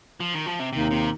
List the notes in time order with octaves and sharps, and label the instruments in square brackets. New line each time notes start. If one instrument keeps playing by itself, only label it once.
[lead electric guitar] F3
D#3
F3
C3
[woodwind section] D#2 D#3 A#3 D#4 [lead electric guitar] C3
[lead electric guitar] C3